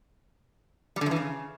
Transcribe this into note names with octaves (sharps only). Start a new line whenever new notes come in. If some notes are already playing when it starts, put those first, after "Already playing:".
G3
D3
F#2
E3
C#3